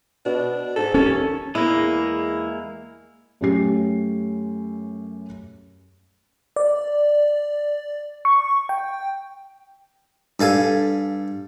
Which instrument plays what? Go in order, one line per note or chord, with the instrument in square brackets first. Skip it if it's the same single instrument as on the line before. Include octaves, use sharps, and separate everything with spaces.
[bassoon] B2 [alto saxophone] D4
[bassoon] G#2 [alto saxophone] A4
[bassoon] D#2 [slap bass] C#4 [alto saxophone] A4
[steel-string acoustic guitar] E2 E4 [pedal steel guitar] G#3 A#3
[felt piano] F#2 A3 C#4 G4 C7
[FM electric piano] D5
C#6
G5
[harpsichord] G2 A4 F5 G#5